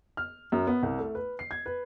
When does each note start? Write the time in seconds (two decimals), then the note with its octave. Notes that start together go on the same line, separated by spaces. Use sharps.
0.17 F6
0.52 F#2
0.67 B3
0.83 C2
0.98 A3
1.15 B4
1.39 C7
1.51 G#6
1.66 B4